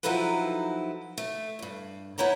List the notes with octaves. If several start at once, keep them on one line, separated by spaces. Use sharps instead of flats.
F3 F#3 D#4 E4 A4 B4
A3
E2 G2
B3 D#4 E4 C#5 A#5